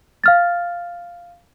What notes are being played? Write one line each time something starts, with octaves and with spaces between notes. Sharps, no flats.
F5 F6 A6